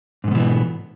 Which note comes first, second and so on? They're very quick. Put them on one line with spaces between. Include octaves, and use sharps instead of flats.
G#2 D#3 B2 E3 B3